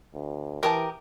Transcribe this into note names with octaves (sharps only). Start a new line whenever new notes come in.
D2
E3 G4 A#4 B4 C#5 A5 D#6